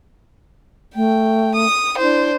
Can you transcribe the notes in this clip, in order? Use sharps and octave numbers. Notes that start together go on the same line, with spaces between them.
A3 G5
D#6
D4 E4 C5